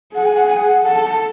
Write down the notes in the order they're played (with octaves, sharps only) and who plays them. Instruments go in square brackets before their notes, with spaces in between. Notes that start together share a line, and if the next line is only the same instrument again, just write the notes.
[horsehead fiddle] G#4 [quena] F#5
[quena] G#5
F#5
G#5
F#5
[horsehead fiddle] A4 [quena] F#5
[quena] A5
A5